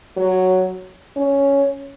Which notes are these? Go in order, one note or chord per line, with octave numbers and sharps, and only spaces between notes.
F#3
C#4